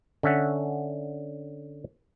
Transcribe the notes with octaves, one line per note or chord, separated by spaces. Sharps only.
D3 C#4 E5 F#5